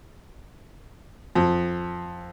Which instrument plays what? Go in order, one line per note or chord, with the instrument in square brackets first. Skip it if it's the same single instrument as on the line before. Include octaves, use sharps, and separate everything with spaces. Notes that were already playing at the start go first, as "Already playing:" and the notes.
[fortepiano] F2